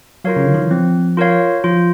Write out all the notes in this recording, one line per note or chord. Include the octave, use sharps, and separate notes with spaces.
F#3 F4 A#4 C#5 F5
C#3
D3
D#3
E3
F3 C4
F4 A#4 C#5 F5
F3 F4